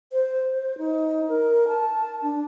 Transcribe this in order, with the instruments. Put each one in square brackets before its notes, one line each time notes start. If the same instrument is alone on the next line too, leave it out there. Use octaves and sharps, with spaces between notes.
[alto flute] C5
C5
D#4
A#4
A5
D4